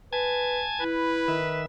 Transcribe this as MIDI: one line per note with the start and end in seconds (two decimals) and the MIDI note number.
0.13 0.61 71
0.13 0.84 80
0.13 0.84 81
0.13 0.84 92
0.80 1.38 64
0.80 1.64 71
1.28 1.66 51
1.28 1.66 76